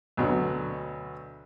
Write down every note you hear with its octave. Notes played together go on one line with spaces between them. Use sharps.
D2 B2 F#3